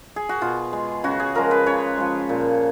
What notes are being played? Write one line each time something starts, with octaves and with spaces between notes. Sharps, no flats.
G#4
F#4
B2 F4
G#3
C#3 F#4
G#4
F3 G#3 A#4
B4
C#3 C#5
F3 G#3
A#2